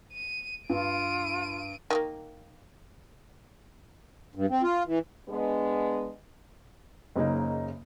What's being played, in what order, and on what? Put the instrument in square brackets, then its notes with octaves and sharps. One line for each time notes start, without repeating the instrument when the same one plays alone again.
[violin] D#7
[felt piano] G2 [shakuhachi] F4 [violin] D7 D#7
[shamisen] D#3 A3 A#3
[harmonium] G2
C4
F4
E3
[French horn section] G#3 B3 D4
[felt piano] F#1 C#3 A#3 D#4